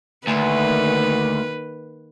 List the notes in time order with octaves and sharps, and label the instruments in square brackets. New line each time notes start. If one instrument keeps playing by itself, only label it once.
[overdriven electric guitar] D2 [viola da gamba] D#3 A#3 B4